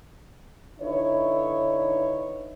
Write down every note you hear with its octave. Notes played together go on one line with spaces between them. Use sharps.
D3 D#4 E4 B4 C#5